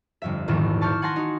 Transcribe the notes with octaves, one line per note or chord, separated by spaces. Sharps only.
G1 F2 E5
E1 A#1 E2 G#2 D#3 E7
A5 C#6 D6 F6 G6
F#5 G#5 A5 C6 F#6 A#6
D#4 F#4